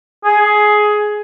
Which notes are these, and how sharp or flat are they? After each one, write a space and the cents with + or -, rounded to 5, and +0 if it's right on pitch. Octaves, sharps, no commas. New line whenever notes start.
G#4 +15